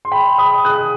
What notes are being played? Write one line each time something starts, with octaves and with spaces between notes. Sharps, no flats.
C6
G5 B5
B5 D#6
D#6 F#6